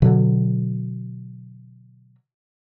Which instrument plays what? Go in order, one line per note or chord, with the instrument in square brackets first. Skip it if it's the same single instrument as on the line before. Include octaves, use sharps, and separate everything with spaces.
[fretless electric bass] B2 D3 F#3